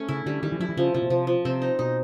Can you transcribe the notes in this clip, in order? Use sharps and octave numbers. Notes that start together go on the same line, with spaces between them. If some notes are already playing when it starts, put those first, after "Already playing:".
Already playing: A3 C#4
C#3 E4
D3 G3
D#3 G3
E3
F3 E4
E3
C#3 F3
C3 F3
B2
C3 F3
F3
C3 C4
D#4
B2 D#4